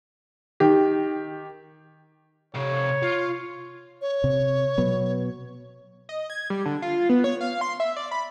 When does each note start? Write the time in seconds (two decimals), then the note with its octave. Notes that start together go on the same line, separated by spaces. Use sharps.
0.60 D#3 G4
2.55 C3 C#5 F5
3.03 F4
4.01 C#5
4.24 C3
4.78 B2 F#3 B3
6.09 D#5
6.30 G#6
6.50 G3
6.66 D3
6.82 F4
7.09 B3
7.24 C#5
7.41 F5
7.61 C6
7.80 E5
7.96 D5
8.11 B5